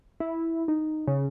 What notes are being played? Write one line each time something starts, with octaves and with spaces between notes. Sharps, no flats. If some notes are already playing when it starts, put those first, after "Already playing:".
E4
D#4
C#3